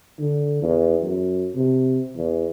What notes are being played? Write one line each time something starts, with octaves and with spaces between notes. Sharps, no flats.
D3
E2
F#2
C3
E2